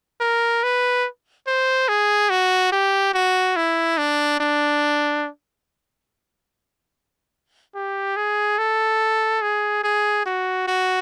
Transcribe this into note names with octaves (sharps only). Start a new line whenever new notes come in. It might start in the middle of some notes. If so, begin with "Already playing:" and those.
A#4
B4
C5
G#4
F#4
G4
F#4
E4
D4
D4
G4
G#4
A4
G#4
G#4
F#4
F#4